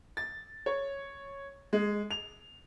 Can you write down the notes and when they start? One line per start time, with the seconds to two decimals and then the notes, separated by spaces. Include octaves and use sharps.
0.17 A6
0.66 C#5
1.73 G#3
2.11 F7